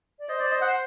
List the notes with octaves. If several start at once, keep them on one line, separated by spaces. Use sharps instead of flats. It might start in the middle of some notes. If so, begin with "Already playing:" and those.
D5
C5 D#5
D5
D#5
F#5